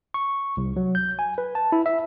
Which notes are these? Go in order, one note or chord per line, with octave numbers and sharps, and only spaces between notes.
C#6
C2
F#3
G6
G#5
B4
A5
E4
E5